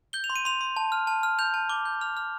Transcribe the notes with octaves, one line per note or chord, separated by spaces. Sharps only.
G6 G7
F7
C6
D#7
C6 F7
C6
A5
F6
A5
F6
G6 F7
A5
D6 G7
G6
F6 F7
F6